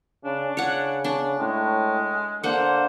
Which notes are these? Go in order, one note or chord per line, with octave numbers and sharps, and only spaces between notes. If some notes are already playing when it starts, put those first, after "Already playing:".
C#3 D4
C#3 C#5 F#5
D4
A2 G#3
D3 A#3 C5 F#5